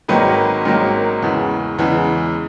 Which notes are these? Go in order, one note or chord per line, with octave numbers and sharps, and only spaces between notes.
G#1 G#2 D#3 F#3 A#3 B4
G#1 G#2 D#3 F#3 A#3 A#4
E2 C#3 E3 G#3
E2 C#3 E3 G#3